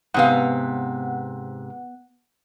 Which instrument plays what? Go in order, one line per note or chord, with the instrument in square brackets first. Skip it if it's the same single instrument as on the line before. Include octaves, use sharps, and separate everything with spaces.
[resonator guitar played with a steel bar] G#2 C3 F5 [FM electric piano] B3 F#5